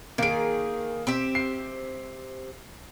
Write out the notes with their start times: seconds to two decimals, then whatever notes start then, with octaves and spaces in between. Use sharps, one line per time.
0.18 D#3 A#3 G#4 D7
1.07 C4 G4 E5
1.35 C7